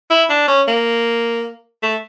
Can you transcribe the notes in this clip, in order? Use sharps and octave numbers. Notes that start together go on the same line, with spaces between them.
E4
D4
C#4
A#3
A3